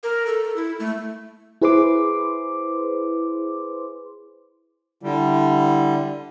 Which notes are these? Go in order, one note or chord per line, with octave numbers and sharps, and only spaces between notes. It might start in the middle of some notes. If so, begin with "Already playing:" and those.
A#4
A4
E4
A3
E4 G#4 B4 C5 C6 D6
D3 G3 E4